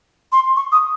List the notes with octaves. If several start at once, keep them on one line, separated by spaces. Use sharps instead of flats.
C6
C#6
D#6